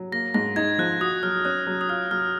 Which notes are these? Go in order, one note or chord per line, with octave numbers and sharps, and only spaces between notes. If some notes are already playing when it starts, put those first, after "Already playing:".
Already playing: F#3
A#3 A#6
G#2 A#6
D#4 G#6
F3 F#6
F#4 D#6
F#3 F6
C#4 F#6
F#3
D#6
F4 F6
F#3 F6